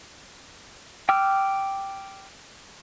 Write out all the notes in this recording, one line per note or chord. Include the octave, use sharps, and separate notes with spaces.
G5 D6 E6 F6